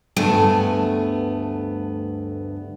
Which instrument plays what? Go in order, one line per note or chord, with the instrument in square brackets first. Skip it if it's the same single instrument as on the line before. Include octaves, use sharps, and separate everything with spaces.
[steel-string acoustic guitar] D2 G2 A3 B3 G#5